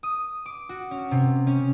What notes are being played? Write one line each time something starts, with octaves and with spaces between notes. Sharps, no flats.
D#6
D6
F#4
C#4
C3
C#4